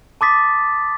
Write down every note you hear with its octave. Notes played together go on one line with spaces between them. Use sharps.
A5 C6 D6 D#6 A6 B6